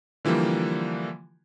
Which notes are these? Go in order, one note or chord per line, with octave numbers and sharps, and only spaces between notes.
D3 E3 F3 G3 A#3